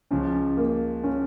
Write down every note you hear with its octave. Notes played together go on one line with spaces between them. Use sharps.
C#2 C#3 F3 C#4
A#3
C#4